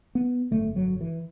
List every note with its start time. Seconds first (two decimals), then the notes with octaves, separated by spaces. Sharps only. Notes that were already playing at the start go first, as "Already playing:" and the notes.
0.15 B3
0.51 G#1 F#2 D3 A3
0.76 F#3
1.01 E3